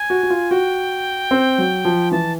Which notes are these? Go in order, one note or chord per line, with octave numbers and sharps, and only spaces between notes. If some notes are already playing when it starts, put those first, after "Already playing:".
Already playing: G#5
F#4
F#4
F4
F#4 G5
C4
F#3
F3
E3 A5